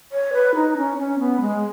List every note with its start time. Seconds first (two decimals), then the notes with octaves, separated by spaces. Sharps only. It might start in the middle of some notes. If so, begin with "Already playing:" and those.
0.12 C#5
0.33 B4
0.55 D#4
0.77 C#4
0.98 C#4
1.19 B3
1.41 G#3